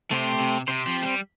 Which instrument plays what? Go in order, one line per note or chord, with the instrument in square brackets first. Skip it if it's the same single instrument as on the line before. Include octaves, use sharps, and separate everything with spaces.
[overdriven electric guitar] C3 [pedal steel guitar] A3 C4 G4 C5
[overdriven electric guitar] C3
[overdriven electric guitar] C3 [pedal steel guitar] C4 G4 C5
[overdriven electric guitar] F3
A3
G3